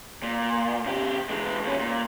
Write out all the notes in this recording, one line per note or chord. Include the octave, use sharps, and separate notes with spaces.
A#2
C#3 G4
E2 G#3
D#2 C#4
A#2